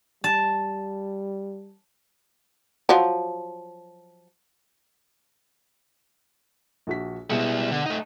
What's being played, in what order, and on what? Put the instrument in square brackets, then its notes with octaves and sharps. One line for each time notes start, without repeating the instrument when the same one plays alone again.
[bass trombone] G3 [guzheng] A5
[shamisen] F3 F#3
[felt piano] A#1 F#4 B6
[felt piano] B2 G#3 C#7 [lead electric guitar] G3 E4
[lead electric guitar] D3
A3 D#4